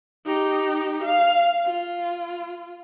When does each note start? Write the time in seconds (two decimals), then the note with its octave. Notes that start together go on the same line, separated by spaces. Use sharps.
0.26 D#4 G4
1.03 F5
1.66 F4